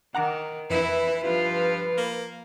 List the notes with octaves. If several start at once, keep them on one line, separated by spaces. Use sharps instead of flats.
D#3 F#5 A#5 D6
F2 E3 E4 B4
G2 F3 F4
A#3